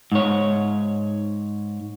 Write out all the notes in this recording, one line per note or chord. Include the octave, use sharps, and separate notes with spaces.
G#2 C#5